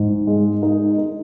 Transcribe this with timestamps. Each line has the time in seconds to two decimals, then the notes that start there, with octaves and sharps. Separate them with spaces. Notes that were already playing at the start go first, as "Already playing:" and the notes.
Already playing: G#2
0.27 G#3
0.63 D#4
0.98 D#4